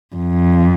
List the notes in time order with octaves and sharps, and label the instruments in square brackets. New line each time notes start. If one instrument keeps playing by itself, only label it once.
[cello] F2